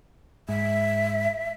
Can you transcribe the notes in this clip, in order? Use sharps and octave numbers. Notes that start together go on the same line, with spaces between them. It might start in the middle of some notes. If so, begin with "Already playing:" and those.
G#2 E5